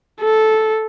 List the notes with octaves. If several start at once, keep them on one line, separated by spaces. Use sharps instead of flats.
A4